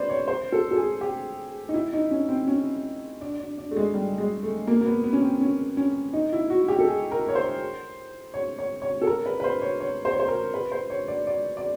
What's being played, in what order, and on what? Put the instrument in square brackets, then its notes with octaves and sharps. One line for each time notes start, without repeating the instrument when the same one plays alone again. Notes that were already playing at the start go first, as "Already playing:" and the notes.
Already playing: [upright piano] B4 C5 D5
C#5
C5
A4
A4
G#4
G4
D#4
E4
D#4
C#4
C4
C#4
D4
D4
D4
A3
G#3
G3
G#3
A3
A#3
A#3
B3
B3
C#4
C4
C#4
C#4
D#4
E4
F#4
G4
A4
G#4
A#4
C#5
C5
C#5
C#5
C#5
A4
A#4
B4
B4
C5
C#5
C#5
C5
C#5
C5
A#4
B4
C5
C#5
D5
D5
D5